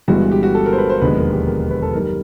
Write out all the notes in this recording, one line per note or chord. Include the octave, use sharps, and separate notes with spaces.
G1 G2 E3 G#3 F#4
G4
F#4
A4
A#4
C5
B4
C5
E1 D#2 D3 F3 G#3 B4
A#4
G4
A#4
B4
A4
F#2 D#3 G3 A#4